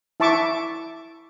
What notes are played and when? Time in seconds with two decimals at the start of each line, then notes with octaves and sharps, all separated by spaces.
0.20 E4 E5 A5 C#6 D6